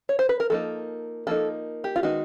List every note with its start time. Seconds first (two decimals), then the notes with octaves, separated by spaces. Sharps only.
0.09 C#5
0.19 C5
0.29 B4
0.40 A#4
0.50 F3 A#3 D#4 A4
1.27 F3 A#3 D#4 A4
1.84 G4
1.96 F4
2.03 D#3 G#3 B3 D#4 F#4